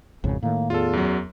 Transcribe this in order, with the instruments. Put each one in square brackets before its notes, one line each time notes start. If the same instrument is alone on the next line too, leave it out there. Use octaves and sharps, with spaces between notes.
[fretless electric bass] G#1 F2 C#3
[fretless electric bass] A2 D#3 [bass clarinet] A#3
[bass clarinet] E2 [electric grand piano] F4 A4
[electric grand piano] F#2 F#3